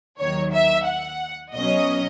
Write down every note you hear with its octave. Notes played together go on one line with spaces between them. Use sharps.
D#2 D#3 F#3 C#5
E5
F#5
B1 B2 F#3 C#4 D#5